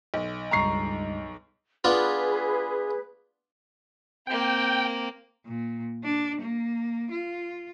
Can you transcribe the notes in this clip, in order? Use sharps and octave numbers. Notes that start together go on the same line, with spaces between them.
B1
C#2 G2 A#5 C#6 C7
B3 D4 F4 G#4 B4
A#3 C4 G5
A#2
D4
A#3
F4